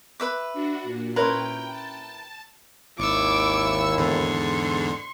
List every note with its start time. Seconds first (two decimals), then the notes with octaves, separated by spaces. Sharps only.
0.20 B4 E5 D6
0.53 D4 F#4
0.83 A#2
1.16 C#4 E4 A#4 B4 C#5 G5 C6
1.70 A5
2.99 G#1 D#2 E4 C#6 D6 E6
3.97 E2 G#2 D3 C6 C#6